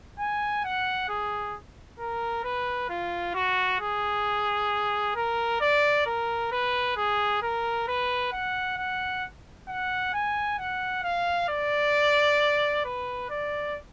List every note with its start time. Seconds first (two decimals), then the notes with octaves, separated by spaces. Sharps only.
0.19 G#5
0.64 F#5
1.09 G#4
1.99 A#4
2.44 B4
2.90 F4
3.35 F#4
3.81 G#4
5.15 A#4
5.61 D5
6.06 A#4
6.52 B4
6.97 G#4
7.43 A#4
7.88 B4
8.32 F#5
8.77 F#5
9.69 F#5
10.14 G#5
10.59 F#5
11.03 F5
11.49 D5
12.85 B4
13.30 D5